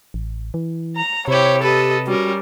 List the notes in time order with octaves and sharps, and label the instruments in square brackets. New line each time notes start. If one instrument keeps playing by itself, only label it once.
[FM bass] A1
E3
[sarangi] A#5
[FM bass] C3 [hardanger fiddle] E4 G4 [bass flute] C5 [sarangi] C#5
[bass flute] G4 [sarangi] A4 [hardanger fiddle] B4 D#5
[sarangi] G3 [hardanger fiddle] C#4 A#4 [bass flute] F#4